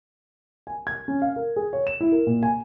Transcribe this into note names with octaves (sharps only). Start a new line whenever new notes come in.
G#5
G#6
C#4
F5
A#4
G#4
C#5
E7
E4
A#4
A#2
G#5